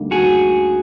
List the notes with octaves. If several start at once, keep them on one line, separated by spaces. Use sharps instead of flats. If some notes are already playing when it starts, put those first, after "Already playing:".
Already playing: D2 D3 G3 A#3 D#4
F#4 G#4